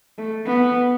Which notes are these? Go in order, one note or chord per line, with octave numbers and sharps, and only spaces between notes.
A3
B3